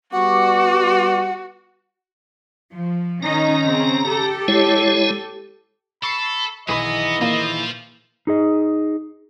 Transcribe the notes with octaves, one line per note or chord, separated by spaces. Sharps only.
G3 B3 F#4 F#5 C#6 D6
F3
D#3 C#4 D#4 A#5
C#3 C4 C#4
G4 A4
G#3 E4 C#5
A4 B5 C#6 C7
B1 D#3 E3 B3 G#4 D#5 B5
A#2 A#3 F4 C5
D#4 G#4 D#5